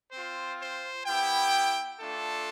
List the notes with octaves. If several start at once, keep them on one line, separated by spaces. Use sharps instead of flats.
C4 F4 C5
C5
B3 E4 G4 G5
A3 D4 F4 A4